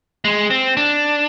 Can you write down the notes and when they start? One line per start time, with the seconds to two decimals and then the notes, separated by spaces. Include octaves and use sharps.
0.25 G#3
0.50 C4
0.77 D4